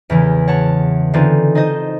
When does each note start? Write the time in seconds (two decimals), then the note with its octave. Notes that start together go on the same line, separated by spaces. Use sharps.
0.10 E2 C#3 E3
0.48 C#5 F#5 A5
1.13 D3 E3 C4 D#4 F4
1.55 D#4 C5 D#5